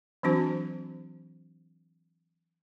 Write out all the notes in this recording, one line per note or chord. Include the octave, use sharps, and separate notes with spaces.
E3 F#3 C4 D4 F#4 C5